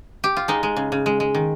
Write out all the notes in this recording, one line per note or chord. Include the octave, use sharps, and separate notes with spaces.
G4
F4
G#3 D#4
G#3
C#3
C#3
G#3
G#3
D#3